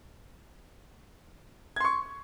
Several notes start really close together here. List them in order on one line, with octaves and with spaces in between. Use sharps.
G#6 C6 C#6